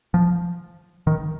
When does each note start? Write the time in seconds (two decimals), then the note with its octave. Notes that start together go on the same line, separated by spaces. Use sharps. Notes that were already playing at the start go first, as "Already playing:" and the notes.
0.14 F3
1.07 D#3